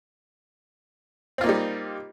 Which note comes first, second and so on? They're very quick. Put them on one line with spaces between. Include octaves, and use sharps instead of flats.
C4 F4 A#3 D#4 G3